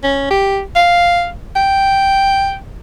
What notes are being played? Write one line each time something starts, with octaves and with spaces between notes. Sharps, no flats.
C#4
G4
F5
G5